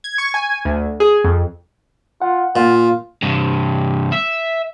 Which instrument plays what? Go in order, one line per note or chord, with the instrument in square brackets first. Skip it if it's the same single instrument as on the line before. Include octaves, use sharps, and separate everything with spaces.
[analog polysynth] G#6
C#6
G#5
D2
G#4
F2
[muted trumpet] F4 [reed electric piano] F#5
[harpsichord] A#2 [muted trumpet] F4
[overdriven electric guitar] G2 C3
E5